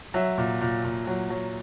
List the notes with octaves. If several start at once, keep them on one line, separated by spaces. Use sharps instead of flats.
F#3 E5
A#2
A#2
A#2
F#3
F#3